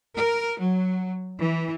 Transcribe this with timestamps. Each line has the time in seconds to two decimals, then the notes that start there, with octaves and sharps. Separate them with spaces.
0.17 A#4
0.60 F#3
1.39 E3